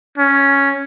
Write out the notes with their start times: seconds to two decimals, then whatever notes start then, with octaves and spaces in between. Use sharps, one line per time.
0.18 C#4